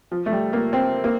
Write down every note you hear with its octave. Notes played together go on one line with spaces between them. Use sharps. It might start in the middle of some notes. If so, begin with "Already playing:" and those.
F3
A3
G3
A#3
C4
A#3